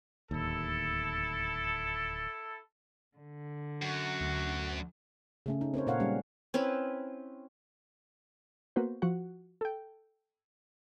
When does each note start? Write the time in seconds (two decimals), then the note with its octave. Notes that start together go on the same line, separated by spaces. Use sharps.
0.31 D1 D#2 E4 A4
3.17 D3
3.82 F#2 F#4
4.21 D2
5.46 C#3 A3 C#4
5.61 D#4
5.74 C4 A#4 C5 C#5
5.87 A#2 A4 A#4 C#5 F5 F#5
6.00 G3 G#3 C#4
6.54 C4 C#4 E4 B4
8.76 A#3 B3 F#4 B4 C5
9.02 F3 F#4 F#5
9.61 A4 G5